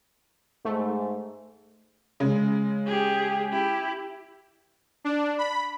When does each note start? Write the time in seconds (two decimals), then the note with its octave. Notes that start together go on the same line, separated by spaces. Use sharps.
0.65 G#2 A3
2.20 C#3 G#3
2.86 G4 G#4
3.52 E4 G4
5.04 D4
5.38 B5